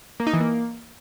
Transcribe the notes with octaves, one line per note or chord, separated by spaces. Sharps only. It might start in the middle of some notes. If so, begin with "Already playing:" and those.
A#3
D#4
E3
A#3